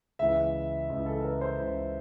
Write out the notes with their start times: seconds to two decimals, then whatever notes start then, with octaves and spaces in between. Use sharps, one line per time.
0.19 C#2 C#3 E3 E5
0.90 C#2 C#3 E3
1.06 A4
1.20 A#4
1.25 B4
1.41 C5
1.59 C#2 C#3 E3